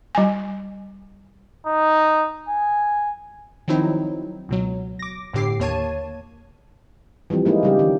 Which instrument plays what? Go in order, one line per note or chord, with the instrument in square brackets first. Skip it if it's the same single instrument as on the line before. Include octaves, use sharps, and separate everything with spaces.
[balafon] G3 G#5
[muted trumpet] D#4
G#5
[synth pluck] D#3 F3 F#3 C4 D#4 E4
C#2 B2 F#3
D6 A#6
G1 A2 D3 G4 D6 C7
D#2 A#3 C#5 A5 G#6 D#7
[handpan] E3 F3 G3 C4
G#3 A#3 D#4 E4
C#3 G3 G4
D#3